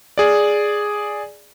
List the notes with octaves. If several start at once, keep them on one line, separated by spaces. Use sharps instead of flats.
G#4 D5